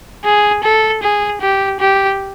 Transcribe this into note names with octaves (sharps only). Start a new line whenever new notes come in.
G#4
A4
G#4
G4
G4